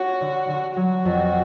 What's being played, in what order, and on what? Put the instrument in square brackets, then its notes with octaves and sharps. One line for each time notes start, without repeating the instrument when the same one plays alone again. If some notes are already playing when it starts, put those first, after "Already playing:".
Already playing: [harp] C#4 F4 [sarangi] F#4
[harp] D3
D3
[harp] F#3 [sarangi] F#4
[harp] F2